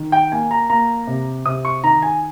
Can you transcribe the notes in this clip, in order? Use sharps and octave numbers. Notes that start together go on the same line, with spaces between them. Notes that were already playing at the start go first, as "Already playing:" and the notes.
Already playing: D#3
G5
A#3 G#5
A#5
A#3 A#5
C3
C3 D#6
C#6
D#3 A#5
G#5